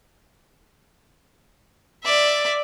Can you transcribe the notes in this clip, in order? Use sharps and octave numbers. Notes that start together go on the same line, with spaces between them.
D5 E5